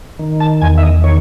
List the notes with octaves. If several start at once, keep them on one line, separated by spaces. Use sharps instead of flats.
D#3
A5
E2 G#5
E5
D#5
D#3 C#5